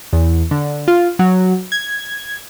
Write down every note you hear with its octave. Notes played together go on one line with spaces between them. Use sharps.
E2
D3
F4
F#3
G#6